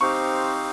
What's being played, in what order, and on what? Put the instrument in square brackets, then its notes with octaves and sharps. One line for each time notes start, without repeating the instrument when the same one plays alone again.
[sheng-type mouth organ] C4 D#4 G4 C5 F5 [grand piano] C#6